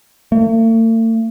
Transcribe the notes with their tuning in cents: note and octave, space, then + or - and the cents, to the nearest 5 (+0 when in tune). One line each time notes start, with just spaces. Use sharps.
A3 +45